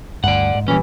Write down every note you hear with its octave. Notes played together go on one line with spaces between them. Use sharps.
D2 G2 D5 F#5
G#2
A#2 E3 F3 G3 C#4